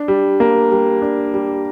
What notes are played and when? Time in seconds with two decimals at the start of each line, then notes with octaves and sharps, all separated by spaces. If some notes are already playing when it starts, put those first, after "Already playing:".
Already playing: D4
0.08 G3
0.40 A#3
0.71 G3
1.02 D4
1.34 G3